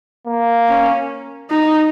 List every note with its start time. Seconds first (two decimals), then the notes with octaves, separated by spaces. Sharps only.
0.27 A#3
0.68 C#4
1.50 D#4